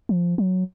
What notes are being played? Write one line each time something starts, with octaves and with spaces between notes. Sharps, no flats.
F3
F#3